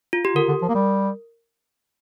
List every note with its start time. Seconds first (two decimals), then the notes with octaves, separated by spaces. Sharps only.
0.13 F4
0.25 G4
0.35 D3 A#4
0.48 D3
0.62 F3
0.69 A#3
0.75 G3